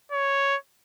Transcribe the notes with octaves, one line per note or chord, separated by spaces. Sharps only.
C#5